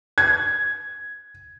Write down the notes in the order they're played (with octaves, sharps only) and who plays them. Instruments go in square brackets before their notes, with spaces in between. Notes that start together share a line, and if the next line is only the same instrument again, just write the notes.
[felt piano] G#6